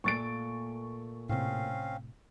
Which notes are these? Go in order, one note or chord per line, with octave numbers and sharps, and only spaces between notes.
A#2 A3 A#3 C#6 A6 D7
A2 C3 C4 C#4 F5